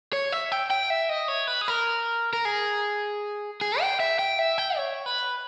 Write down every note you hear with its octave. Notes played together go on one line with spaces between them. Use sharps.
C#5
E5
G5
G5
E5
D#5
C#5
B4
G#4
A#4
A#4
G#4
G#4
G5
E5
G5
E5
G5
C#5
B4